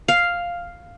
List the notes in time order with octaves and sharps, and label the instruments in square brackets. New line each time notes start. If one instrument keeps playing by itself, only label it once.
[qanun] F5